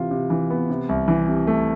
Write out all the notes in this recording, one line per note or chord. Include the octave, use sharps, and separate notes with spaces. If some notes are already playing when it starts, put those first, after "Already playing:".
Already playing: C3 E3 F4
C3
E3
B3
C3
C2
E3
C3
A3